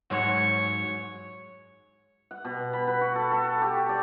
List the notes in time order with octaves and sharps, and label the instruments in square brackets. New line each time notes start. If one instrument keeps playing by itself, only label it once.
[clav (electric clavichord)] G#2 F#3 F#4 [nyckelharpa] C#5
[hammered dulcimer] F#5
B2
B5
B4
F#4
A4
A4
G4
D5